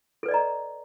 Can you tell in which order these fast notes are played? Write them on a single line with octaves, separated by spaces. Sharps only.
A4 B4 D5 D#5 A#5